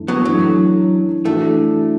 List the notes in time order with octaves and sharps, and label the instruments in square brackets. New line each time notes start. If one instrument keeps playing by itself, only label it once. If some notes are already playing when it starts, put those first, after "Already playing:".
Already playing: [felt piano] F#2 E3 A3 D4
[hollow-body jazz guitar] F#3 B3
[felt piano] E3 D4 A4 [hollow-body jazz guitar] F#3
[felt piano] E3 D4 F#4 A4 [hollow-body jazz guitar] A3